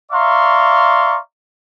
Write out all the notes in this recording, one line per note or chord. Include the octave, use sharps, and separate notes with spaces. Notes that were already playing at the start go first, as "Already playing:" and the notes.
D5 E5 F5 A#5 C6 C#6